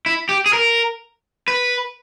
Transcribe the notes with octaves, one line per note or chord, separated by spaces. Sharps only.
E4
G4
G#4
A#4
B4